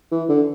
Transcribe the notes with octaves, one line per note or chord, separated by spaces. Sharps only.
E3
D3